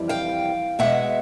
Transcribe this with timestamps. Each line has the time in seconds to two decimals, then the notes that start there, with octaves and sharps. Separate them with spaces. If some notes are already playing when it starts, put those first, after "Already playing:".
Already playing: F2 C3 E3 G3
0.09 F5 G5
0.79 B2 G#3 E5 F#5